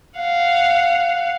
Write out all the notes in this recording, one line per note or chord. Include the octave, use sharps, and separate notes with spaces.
F5 F#5